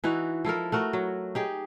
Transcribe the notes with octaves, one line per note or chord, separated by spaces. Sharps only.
E3 D#4 E4 F#4
F3 E4 A4 A#4
A3 F#4 A#4
F#3
D#4 G4 G#4